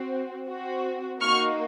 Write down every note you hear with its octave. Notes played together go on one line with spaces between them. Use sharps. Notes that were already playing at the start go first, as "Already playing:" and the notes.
Already playing: C4 F#4
C4 F#4
A#3 D#4 F#4 C#6 F6